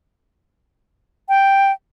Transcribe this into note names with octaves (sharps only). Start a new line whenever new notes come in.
G5